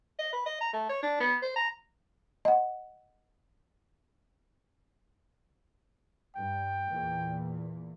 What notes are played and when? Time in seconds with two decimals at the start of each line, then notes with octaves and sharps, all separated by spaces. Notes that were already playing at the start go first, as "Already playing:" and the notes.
0.19 D#5
0.32 B4
0.46 D#5
0.61 A#5
0.73 A3
0.89 C#5
1.02 D4
1.20 B3
1.42 C5
1.56 A#5
2.45 D#5 F#5
6.36 G2 G5
6.90 E2 A#2 E3